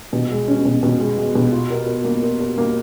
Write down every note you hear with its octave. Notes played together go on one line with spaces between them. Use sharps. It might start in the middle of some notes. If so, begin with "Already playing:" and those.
B2
G#3
C#4
B2
B2
G#3
G#3
B2
F4
A#4
A#4
A#3
A#4
A#4
A#3